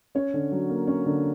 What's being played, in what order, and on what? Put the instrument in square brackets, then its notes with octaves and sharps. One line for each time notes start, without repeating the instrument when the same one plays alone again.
[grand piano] C#4 C#5
D3
F#3
A#3
C#4
D3